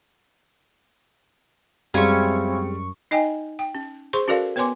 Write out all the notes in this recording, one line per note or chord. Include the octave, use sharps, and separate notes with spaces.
F#2 G3 G#3 C4 C#4 E4 F4 C#6
D#4 D#5 G5 G#5
G5
C#4
G#4 C5 C6 C#6
C#4 F#4 A4 A#4 D5 F5
B3 B4 C#5 G#5 C6 D6